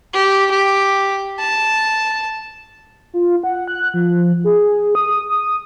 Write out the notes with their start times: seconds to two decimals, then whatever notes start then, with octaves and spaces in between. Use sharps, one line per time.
0.14 G4
0.51 G4
1.39 A5
3.14 F4
3.44 F#5
3.68 F#6
3.94 F3
4.44 G#4
4.95 D#6
5.30 D#6